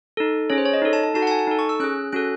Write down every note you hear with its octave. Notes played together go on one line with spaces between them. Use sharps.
D#4 A4
C#4 G#4 C#5
C5
C#5
D#5
D#4 A4
A5
A5
D#4 F#4 A4 A5
F#5
A5
G#5
A5
D#4 A4
C#6
E6
C#4 G#4 F#6
C#4 F#4 A4 F#6